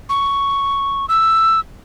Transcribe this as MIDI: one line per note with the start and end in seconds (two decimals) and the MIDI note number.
0.09 1.06 85
1.09 1.60 88